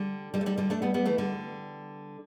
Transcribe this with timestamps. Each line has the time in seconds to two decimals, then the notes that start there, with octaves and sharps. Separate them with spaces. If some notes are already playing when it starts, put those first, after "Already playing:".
Already playing: D3 G3
0.34 D3 G3
0.41 A3
0.46 D3 G3
0.58 D3 G3
0.70 A3 D4
0.82 G3 B3
0.94 G3 B3
1.06 E3 A3
1.18 D3 G3